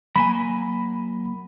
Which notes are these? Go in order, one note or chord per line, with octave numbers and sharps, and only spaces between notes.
F#3 A#3 G#5 B5